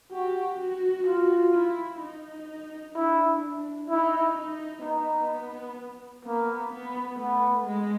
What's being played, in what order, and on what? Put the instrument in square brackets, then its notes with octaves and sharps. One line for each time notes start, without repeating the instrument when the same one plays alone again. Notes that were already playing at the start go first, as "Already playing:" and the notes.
[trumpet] F#4 [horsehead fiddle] G4
[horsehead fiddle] F#4
[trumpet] F4
[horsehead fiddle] E4
D#4
[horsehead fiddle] D4 [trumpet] E4
[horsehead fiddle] D#4 [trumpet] E4
[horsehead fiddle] D#4
[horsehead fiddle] B3 [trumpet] D#4
[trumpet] A#3 [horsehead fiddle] B3
[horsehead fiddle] B3
[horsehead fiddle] A3 [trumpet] B3
[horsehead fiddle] G#3